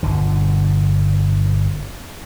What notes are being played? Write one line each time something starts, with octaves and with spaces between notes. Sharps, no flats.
G1 B2 D3